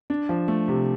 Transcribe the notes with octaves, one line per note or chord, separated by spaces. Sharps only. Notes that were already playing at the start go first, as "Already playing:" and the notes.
D4
F3
A3
C3